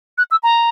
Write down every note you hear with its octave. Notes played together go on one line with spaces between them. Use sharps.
F#6
E6
A#5